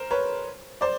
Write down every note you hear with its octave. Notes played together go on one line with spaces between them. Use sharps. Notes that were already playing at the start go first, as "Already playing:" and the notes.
Already playing: A#4 C5
B4 C#5
C5 D5